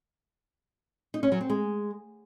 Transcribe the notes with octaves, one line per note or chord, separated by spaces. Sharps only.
D#4
C#4
F#3
C4
G#3